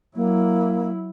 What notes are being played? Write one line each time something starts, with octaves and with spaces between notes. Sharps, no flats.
F#3 A#3 E4